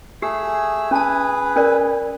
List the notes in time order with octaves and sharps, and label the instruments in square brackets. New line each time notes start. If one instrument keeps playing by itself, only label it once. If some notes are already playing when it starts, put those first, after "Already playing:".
[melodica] A3 G#4 E6 [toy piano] G4
[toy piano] C#4 A5 [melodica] G#4 B4
[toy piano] C#4 A#4 D5